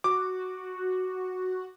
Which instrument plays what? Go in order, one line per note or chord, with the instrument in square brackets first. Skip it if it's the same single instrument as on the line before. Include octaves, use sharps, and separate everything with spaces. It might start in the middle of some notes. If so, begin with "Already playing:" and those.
[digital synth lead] F#4 [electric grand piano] D6